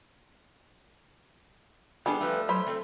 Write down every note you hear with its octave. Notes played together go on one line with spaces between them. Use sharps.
G3 B3 D4 G#4 A4
F3 A3 B4
F#3 C5 B5
A3 C4 A4